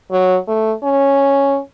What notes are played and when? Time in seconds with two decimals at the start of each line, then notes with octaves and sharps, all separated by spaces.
0.12 F#3
0.48 A3
0.84 C#4